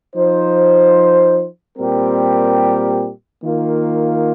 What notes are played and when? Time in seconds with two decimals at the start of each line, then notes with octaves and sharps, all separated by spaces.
0.15 F3 D#4 C5
1.78 A#2 G3 C4 G4 A#4
3.43 D#3 A#3 F4